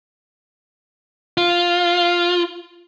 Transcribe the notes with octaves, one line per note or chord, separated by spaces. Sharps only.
F4